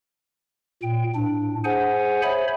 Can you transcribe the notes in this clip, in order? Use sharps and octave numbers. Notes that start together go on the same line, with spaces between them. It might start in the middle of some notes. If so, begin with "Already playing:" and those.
A#2 G5
A2 D4
G#4 C5 F#5 G#5
C5 C#5 E5 B5